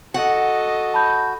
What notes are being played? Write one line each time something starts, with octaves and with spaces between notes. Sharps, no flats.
F#4 A4 D#5 F#5
A5 B5 G6